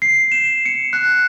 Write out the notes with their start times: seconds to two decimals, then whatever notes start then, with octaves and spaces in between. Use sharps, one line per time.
0.02 C7
0.32 E7
0.65 C#7
0.93 F#6